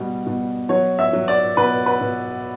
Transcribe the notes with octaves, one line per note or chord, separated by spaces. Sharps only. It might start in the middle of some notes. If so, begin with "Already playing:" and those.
Already playing: B2 G3
B2
F#3 C#5
E5
F#3
D5
B2 B4
B4
B2